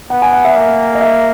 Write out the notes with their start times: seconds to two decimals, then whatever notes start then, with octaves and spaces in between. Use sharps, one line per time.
0.10 B3 F#5
0.22 G#5
0.33 F#5
0.45 E5
0.56 A#3
0.95 D#5
1.01 E5